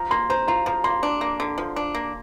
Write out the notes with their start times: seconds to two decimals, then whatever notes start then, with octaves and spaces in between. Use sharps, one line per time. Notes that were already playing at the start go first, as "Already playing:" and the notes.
Already playing: F3 A#5
0.11 A#3 C6
0.30 C5 A#5
0.48 F4 A#5
0.66 F3 A#5
0.84 A#3 C6
1.03 D4
1.21 A#3
1.40 D3
1.58 F3
1.76 D4
1.95 A#3